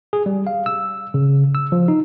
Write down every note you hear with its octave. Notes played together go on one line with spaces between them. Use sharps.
G#4
G3
F5
E6
C#3
E6
F3
D#4